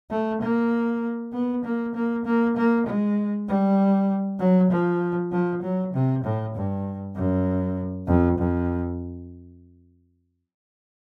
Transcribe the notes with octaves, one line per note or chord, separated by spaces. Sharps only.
A3
A#3
B3
A#3
A#3
A#3
A#3
G#3
G3
F#3
F3
F3
F#3
C3
A2
G2
F#2
F2
F2